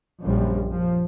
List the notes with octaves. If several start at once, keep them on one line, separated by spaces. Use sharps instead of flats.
A#1 F#2 F3 G3
F3